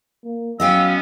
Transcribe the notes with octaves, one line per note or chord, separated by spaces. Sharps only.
A#3
F#3 B3 C#4 D#5 F5 G5 E6